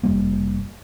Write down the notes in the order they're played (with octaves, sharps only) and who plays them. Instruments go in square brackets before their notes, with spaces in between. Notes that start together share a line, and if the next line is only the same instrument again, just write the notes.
[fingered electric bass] F1 G3 A#3